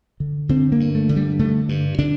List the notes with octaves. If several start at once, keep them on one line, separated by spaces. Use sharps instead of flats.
D3
D3 C4
A#3
G2
A3
D3
G3
D3 A3
G2
D3 D4